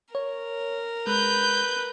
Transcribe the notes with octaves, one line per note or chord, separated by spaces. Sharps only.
A#4 C#5
G#3 B4 F#6 G6